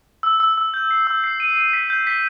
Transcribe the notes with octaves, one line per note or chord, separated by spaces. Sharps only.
E6
E6
E6
G6
C7
E6
C7
D#7
D#7
B6
G6
B6